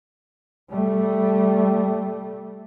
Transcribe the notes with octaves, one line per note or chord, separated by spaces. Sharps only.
G3 A3